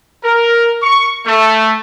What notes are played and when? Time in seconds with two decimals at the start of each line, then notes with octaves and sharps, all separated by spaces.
0.24 A#4
0.83 C#6
1.26 A3